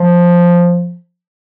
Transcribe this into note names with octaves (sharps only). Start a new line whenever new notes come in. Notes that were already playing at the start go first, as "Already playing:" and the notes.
Already playing: F3